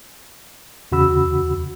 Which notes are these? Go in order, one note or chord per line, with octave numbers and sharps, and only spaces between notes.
E2 C#3 F#4 B5 E6